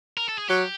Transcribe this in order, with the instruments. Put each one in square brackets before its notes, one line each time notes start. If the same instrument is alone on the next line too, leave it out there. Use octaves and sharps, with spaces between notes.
[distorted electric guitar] A#4
A4
G#4
[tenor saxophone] F#3 [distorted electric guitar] G4